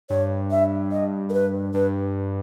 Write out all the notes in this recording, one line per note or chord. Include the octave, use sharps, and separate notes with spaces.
G2 C#5
E5
D#5
A#4
B4
G2 B4